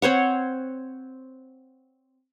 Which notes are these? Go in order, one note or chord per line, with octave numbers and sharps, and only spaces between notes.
C4 C5 C#5 F#5